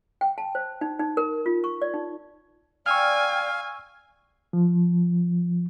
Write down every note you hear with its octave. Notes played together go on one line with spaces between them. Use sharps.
G5
A5
C5
D#4
D#4
A#4
F4
C#6
D5
D#4
D5 F5 G5 G#5 C#6 E6 F6
F3